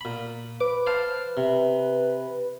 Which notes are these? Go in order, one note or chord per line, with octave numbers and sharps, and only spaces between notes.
A#2 B5
B4 D6
C5 F5 A5
C3